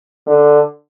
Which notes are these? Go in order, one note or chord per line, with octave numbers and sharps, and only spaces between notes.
D3